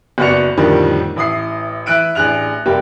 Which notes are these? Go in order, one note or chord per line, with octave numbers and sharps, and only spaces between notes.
F#1 B3 F#4 D5 C#7 F7
F2 A2 D3 D#3 G3 A#3
A1 E4 D#6 C7
E3 E5 F#6 D7 D#7
A1 D4 G#4 F#6 F7
F1 G3 A#3 G4